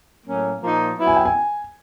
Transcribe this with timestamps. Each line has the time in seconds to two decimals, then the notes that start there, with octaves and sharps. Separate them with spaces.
0.26 A2 F#3 A#3 C#4
0.63 A#2 F3 A#3 D#4
0.98 F#3 B3 E4
1.07 G#5
1.16 G5
1.25 G#5